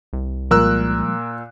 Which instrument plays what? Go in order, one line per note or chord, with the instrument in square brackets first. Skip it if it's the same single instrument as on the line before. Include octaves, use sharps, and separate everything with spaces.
[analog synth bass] C2
[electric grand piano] A#2 E6 F#6 [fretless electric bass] F3 G3 G#3 [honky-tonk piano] A#4